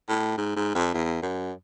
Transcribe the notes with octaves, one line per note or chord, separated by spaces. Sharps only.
A2
G#2
G#2
F2
E2
F#2